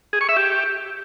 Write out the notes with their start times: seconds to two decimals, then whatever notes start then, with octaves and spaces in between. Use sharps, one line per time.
0.13 G#4
0.21 C#6
0.29 E5
0.37 G4